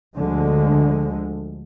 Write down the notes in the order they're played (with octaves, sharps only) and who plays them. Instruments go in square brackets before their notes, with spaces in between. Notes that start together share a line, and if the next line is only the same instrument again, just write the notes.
[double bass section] D2 D3 F3 G#3